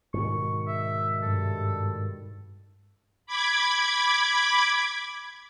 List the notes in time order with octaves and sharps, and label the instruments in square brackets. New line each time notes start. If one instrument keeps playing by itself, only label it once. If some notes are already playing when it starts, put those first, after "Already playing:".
[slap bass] G#2 B2 D#3 [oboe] C#6
[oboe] E5
[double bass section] G2 [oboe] A4
[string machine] B5 D6 G#6